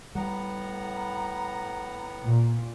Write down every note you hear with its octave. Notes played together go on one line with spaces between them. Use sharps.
A2 G3 B3 F#5 A#5
A#2